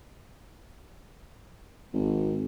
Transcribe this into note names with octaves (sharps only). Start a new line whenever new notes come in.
G#1